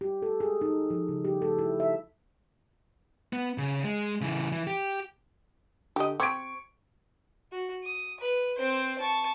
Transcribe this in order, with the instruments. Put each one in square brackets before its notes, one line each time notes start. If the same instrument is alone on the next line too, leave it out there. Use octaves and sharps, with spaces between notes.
[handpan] G4
A4
G#4
D#4
F3
C#3
G4
A4
E4
E5
[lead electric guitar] B3
C#3
G#3
C#3 E3
E3
G4
[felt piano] D3 [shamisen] G4 D#5
[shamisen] C4 [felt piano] C#6 G#6 D7
[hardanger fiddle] F#4
D#6
B4
C4 C5
A5 C#6